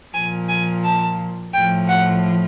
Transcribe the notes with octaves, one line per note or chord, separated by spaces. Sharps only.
A#2 F3 G#5
G#5
A5
A2 F3 G5
F#5